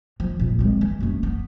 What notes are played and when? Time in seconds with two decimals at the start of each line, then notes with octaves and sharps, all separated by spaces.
0.20 F3
0.40 A#2 F3
0.59 G#3 C4
0.81 E3
1.00 F#2 A3
1.23 B3